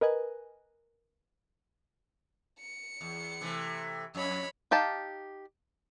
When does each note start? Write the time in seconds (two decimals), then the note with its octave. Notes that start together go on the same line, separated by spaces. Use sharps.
0.01 A#4 B4 D#5 G#5 F#6
2.59 C#7
3.01 E2
3.41 C3 E3 A3
4.15 F2 C#5 B5
4.71 D#4 G4 F5 A5